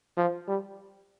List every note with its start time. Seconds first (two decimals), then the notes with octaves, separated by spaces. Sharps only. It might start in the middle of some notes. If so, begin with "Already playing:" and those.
0.17 F3
0.48 G3